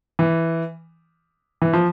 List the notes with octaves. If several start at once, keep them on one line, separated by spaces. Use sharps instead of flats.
E3
E3
F3